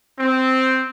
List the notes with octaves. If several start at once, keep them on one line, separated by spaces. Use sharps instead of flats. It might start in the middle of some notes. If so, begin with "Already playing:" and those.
C4